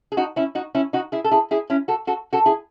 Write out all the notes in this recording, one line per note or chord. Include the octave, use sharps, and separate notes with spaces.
G#4
D#4 F#4
C#4 E4
D#4 F#4
C#4 E4
D#4 F#4
E4 G#4
A4
E4 G#4
E4 G#4
C#4 E4
F#4 A4
F#4 A4
F#4 A4
E4 G#4